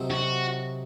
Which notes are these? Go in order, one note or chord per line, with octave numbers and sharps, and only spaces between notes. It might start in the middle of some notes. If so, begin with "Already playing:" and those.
Already playing: C3 F#3 C4 D#4 A4
F#4